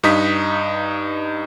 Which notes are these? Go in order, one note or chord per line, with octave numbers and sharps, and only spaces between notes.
G2 D#4 D#6 B6